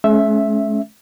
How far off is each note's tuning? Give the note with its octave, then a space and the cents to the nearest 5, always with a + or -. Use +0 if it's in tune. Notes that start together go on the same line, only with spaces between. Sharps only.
G#3 +45 C#4 +0 E5 +0